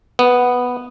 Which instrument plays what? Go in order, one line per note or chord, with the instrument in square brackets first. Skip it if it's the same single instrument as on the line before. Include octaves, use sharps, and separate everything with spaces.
[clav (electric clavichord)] B3